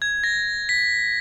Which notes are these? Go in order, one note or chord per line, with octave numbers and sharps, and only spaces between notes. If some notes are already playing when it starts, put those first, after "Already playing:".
G#6
A#6
B6